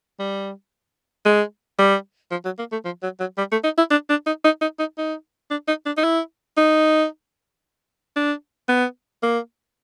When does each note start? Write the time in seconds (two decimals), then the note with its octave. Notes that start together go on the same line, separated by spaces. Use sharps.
0.19 G3
1.25 G#3
1.79 G3
2.31 F3
2.45 F#3
2.59 A#3
2.72 A3
2.85 F3
3.03 F#3
3.20 F#3
3.38 G3
3.52 A3
3.64 D#4
3.77 E4
3.90 D4
4.09 D4
4.26 D#4
4.44 D#4
4.61 D#4
4.79 D#4
4.98 D#4
5.50 D4
5.67 D#4
5.86 D4
5.97 D#4
6.04 E4
6.57 D#4
8.16 D4
8.68 B3
9.23 A#3